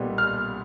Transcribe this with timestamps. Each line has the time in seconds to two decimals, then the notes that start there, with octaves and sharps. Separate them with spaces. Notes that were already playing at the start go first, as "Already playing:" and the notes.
Already playing: B1 A#2 G3 B3
0.18 F6